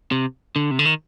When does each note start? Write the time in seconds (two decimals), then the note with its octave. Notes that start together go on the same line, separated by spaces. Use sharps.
0.11 C3
0.56 D3
0.71 C3
0.79 D3
0.85 D#3